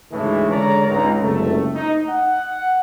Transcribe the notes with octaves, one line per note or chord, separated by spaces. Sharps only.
D2 G#2 C#3 E3 G#3 A3
D3 G#3 A#4 C#5 D5 A#5
G#1 C#2 A#5
F#1 C#2 C3 A3
D#4
F#5